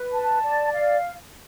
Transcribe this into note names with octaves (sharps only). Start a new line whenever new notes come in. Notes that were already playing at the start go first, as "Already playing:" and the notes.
Already playing: B4
A5
D5
F5